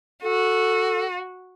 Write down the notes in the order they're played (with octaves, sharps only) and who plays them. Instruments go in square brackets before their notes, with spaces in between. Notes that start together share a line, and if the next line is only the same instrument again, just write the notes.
[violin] F#4 [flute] A4